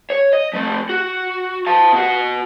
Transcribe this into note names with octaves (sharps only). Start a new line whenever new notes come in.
C#5
D#5
F3 A3
F#4
F5 A5
B2 F#4